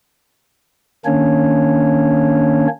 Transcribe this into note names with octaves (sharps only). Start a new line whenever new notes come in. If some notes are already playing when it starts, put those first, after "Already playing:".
D#3 A#3 C#4 D4 C#5